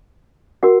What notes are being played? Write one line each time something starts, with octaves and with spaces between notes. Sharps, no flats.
F#4 A#4 F#5